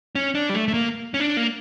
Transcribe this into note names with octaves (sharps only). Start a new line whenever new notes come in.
C#4
D4
G3
A3
A3
A#3
C#4
D4
A#3